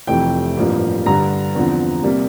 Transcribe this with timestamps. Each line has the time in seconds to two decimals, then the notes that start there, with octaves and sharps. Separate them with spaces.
0.07 F1 F2 C3 E3 A3 G5
0.57 A1 G2 F3 A#3
1.06 G2 D3 G3 A#5
1.55 E2 D3 F3 C4
2.03 C3 G3 A#3